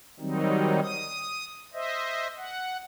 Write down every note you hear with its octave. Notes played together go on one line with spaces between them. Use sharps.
D#3 F#3 G3 C4 D#4
D#6
C5 D#5 E5
F#5